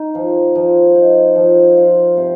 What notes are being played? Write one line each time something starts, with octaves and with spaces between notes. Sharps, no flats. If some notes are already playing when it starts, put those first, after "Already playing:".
Already playing: D#4
F3
F3
D#4
F3
F4
C3